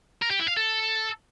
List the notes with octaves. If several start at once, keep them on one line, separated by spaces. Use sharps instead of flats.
A#4
G4
E4
F5
A4